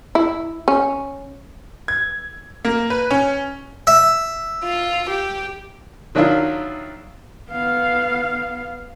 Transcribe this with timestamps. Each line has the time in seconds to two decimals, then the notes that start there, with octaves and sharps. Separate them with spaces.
0.15 E4
0.68 C#4
1.88 G#6
2.65 A#3
2.90 B4
3.11 C#4
3.87 E5
4.64 F4
5.10 G4
6.15 D#3 F#3 D4 E4 F4
7.51 B3 F5